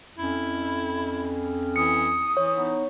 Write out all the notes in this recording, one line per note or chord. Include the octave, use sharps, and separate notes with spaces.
F2 C#4 E4
E3 D#6 C#7
E3 C#5
B3 D#4